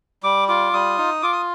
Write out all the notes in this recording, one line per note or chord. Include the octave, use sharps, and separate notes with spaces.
G3 D6
F4 D6
G3 D#6
D#4
F4 D6
D#6